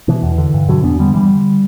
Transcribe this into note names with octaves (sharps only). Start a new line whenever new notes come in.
B2 E3
E2
D3
G2
B2 D3 F#3
E2 B3 D4
D3 G3 B3
G2 E3 G3
D3